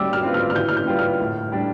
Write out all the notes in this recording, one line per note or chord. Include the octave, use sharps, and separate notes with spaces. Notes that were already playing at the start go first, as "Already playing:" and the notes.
Already playing: G3 D6 E6
F6
C4 F4 B4
F6
F6
E3 G6
F6
G6
G3 B3 F4 B4
F6
A2
G3 D4